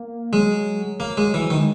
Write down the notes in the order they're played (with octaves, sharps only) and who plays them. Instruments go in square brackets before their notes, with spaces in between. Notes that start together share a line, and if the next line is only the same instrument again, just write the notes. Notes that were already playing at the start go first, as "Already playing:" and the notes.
Already playing: [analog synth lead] A#3
[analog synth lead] F#3 [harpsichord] G#3
[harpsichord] A#3
G#3
E3
D#3
[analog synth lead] G#3